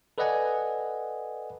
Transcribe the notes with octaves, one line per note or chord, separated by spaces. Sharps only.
A4 B4 D5 D#5 F#5 G#5